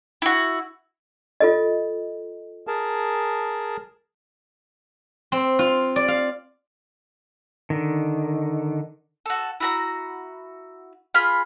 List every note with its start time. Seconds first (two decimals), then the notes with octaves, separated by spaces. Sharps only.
0.22 E4 F#4
1.40 F4 A4 D#5
2.67 G#4 A#4 A5
5.32 C4
5.59 F4
5.96 D5
6.08 F5
7.70 D3 D#3
9.26 F#4 A4
9.60 E4 F#4 A#5
11.14 F4 G#4 B5 F6